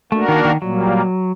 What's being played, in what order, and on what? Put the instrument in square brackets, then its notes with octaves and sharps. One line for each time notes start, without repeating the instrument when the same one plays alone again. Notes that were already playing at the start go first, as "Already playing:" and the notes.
[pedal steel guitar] A3 [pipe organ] A#3 D4 F#4 A#4
[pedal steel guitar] D#3
D#3
[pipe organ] A#2 G3 A#3 [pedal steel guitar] F#3